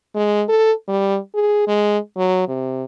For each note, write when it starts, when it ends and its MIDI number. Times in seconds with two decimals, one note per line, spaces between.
0.15 0.43 56
0.49 0.73 69
0.88 1.18 55
1.35 1.67 68
1.67 1.98 56
2.17 2.46 54
2.48 2.84 48